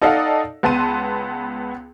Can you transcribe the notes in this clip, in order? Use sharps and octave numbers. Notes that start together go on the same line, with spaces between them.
D#4 A4 D5 D#5 F5 F#5
C#2 B3 A5 C6 D#7